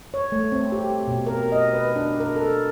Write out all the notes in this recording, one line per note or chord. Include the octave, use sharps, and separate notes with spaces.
C#5
A3
C4
G4
B2
A#4
D#5
B4
D4
A#4
A4